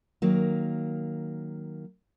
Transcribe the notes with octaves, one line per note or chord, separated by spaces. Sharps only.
D#3 F#3 A#3